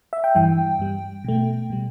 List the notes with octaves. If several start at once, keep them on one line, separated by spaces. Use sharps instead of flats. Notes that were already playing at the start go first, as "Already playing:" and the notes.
E5
G5
G2 E3 G3 G5
G2 G3
B2 A3
B2 G3